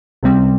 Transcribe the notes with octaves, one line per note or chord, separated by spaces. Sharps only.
C#2 C3 G3 C4